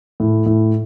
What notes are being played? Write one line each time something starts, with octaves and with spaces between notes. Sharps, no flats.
A2
A2